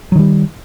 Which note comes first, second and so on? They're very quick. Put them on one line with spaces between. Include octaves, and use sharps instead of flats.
F#3 D#3 G3